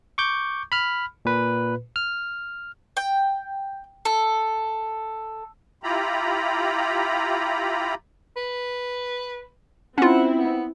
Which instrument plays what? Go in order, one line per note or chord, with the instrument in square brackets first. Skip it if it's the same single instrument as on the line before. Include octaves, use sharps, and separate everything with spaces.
[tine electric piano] C#6 D6 G6
B5 F6
A#2 B4
F6
[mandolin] G5
A4
[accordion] E4 F4 G4 A#5 B5
[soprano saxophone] B4
[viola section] C4 E4 [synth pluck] C#4 F4 [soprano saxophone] F#5
[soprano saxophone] B3